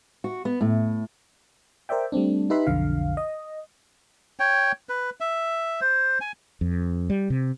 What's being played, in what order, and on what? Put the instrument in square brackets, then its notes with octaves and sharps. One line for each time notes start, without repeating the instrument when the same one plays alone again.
[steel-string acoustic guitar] F#4
B3
A2
[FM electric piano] A#4 C5 D5 E5 G5
G3 A3 C4 D4
D#4 G4 B4 E5 B5 C6
B1 F2 D3 F5
D#5
[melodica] C#5 G5
B4
E5
C5
G#5
[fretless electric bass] F2
G3
C3